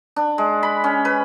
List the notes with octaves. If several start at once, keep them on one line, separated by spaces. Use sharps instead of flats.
D4
G#3
B5
C#4
B4